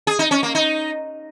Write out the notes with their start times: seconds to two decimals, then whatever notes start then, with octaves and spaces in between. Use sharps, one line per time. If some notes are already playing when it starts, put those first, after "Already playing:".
0.07 G#4
0.19 D#4
0.31 C#4
0.43 A#3
0.55 D#4